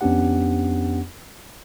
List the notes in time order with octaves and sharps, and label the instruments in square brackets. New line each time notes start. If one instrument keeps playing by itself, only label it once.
[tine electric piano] F2 B3 C#4 D4 G4 F#5